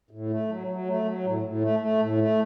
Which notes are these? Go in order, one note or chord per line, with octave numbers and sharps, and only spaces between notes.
A2
A3
F#3
F#3
A3
F#3
A2
A2
A3
A3
A2
A3